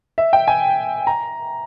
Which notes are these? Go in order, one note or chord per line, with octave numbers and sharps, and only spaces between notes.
E5
G5
G#5
A#5